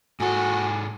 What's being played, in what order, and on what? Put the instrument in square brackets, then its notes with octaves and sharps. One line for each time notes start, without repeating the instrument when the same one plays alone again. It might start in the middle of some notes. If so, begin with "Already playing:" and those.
[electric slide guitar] G#2 A4 [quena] F#4 [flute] G#5